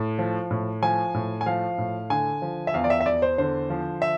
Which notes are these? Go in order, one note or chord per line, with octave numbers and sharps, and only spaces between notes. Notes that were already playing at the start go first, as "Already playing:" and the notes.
Already playing: A2
F3
A2
F3 G#5
A2
G#5
F3 F5
A2
D3 G#5
F3
E5
E2 F5
D5
E5
E5
E2 D5
C5
D3 C5
F3
E5